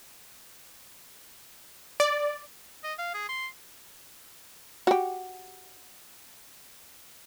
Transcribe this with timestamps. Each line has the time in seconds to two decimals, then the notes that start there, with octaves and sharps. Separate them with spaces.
2.00 D5
2.84 D#5
2.99 F5
3.14 G#4
3.29 C6
4.87 F#4 G4